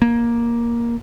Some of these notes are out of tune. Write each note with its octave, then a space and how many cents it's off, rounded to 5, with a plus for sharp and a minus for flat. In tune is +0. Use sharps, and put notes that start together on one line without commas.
A#3 +10